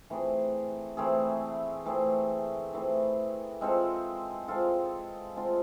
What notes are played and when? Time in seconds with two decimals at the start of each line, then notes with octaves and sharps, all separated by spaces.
0.10 E3 A3 C4 G#4
0.97 E3 A3 C4 G#4
1.85 E3 A3 C4 G#4
2.73 E3 A3 C4 G#4
3.61 G#3 C4 F4 A4
4.48 G#3 C4 F4 A4
5.36 G#3 C4 F4 A4